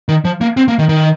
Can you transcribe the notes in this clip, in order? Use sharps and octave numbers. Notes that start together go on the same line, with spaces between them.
D#3
F3
A#3
C4
A#3
D#3
D#3